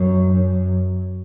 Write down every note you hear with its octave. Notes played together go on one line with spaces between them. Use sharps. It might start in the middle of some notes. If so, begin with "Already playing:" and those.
Already playing: F#2
F#2